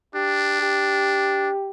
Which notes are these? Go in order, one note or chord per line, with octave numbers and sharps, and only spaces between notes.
D4 G4
G4